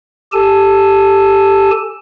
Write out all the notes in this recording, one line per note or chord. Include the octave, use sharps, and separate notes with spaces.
G4 A4 G#5 A5